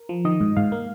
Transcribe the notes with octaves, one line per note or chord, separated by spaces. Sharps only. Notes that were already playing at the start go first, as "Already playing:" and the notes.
Already playing: A#4
F3
D#3 D#5
G#2
G#2 F5
A#3